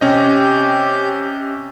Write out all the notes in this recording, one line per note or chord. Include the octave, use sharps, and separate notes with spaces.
C3 C#4 G4 D#5 G6